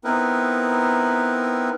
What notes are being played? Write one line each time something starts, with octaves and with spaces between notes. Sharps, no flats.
B3 C4 D#4 E4 A#4 B4